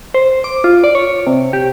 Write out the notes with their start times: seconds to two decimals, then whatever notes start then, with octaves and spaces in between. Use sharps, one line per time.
0.14 C5
0.44 D6
0.64 F4
0.84 D5
0.95 C#5
1.27 C3
1.53 G4